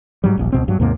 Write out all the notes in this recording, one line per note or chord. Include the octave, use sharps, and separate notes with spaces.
G#2 F#3 G3
D#1 A#1
C#2 B2 C4
G2 F#3
D#2 G#2 C3 A#3